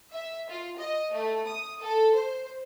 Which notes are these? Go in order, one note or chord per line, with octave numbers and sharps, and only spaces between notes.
E5
F4
D#5
A3
D#6
A4
C5